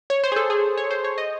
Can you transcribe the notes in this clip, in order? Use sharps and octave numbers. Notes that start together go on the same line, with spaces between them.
C#5
C5
G#4
A4
G#4
C#5
C5
C#5
D#5